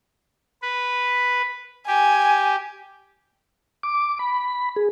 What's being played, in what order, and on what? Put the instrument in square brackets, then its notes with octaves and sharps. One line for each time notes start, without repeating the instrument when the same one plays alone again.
[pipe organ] B4
[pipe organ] G4 [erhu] G#5
[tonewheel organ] D6
B5
G#4